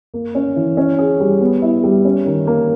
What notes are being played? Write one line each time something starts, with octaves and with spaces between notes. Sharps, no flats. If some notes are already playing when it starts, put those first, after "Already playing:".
A#3
C#4
E3
C#4
G#4
G3
B3
E4
G3
C#4
D#3
A#3